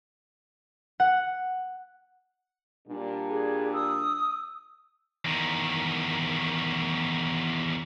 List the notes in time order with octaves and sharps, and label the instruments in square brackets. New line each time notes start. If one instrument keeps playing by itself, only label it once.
[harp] F#5
[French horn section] A#2 G3 D4
[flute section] G#4
D#6 E6
[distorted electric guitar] E2 D#3